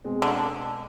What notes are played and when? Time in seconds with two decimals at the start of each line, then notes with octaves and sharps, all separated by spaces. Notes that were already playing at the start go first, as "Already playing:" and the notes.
0.04 B2 G#3 C4
0.22 D3